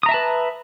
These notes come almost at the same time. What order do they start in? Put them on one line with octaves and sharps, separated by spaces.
D#6 A#5 E5 A5 B4